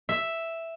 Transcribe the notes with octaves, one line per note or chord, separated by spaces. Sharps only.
E5